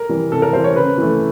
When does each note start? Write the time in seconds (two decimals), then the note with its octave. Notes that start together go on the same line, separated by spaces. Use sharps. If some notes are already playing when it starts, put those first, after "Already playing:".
Already playing: A#4
0.09 E3 G3
0.32 C3 A4
0.42 A#4
0.53 E3 G3 C5
0.64 C#5
0.76 C#3 B4
0.98 E3 A3